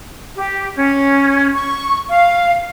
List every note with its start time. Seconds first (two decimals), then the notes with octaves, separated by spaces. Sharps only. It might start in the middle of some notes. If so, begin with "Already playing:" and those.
0.37 G4
0.76 C#4
1.52 C#6
2.09 F5